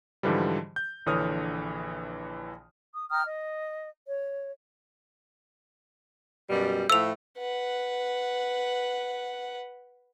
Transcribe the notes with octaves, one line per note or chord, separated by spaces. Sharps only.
G#2 D3 E3 F3 G3
G6
A#1 D3 E3 C#5 D#6 F6
D#6
G5 A#5 D#6 F6
D#5
C#5
F#2 B2 G3
A2 F3 A3 E6 F7
B4 F#5